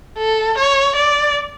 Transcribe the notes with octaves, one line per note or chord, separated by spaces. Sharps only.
A4
C#5
D5